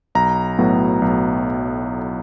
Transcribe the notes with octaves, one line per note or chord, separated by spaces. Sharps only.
B1 A#5
A2 F#3 B3
B1